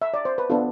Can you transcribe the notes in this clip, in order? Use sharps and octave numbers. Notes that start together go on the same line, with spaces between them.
E5
D5
C5
B4
B3 D4 F4 A4